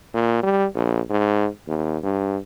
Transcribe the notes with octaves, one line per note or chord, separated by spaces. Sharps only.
A#2
G3
A#1
G#2
D#2
G2